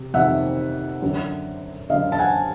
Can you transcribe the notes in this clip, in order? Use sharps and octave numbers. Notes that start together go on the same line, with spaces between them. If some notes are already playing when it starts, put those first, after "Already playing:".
Already playing: C3
F2 C3 D#3 E5 F#5
F#2 D3
F#2 D3 D#5 F5
A5
F#5 G#5